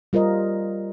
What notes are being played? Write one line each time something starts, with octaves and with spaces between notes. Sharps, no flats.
G3 F4 A#4 C5 D#5